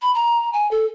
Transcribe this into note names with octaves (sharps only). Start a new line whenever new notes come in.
B5
A#5
G#5
A4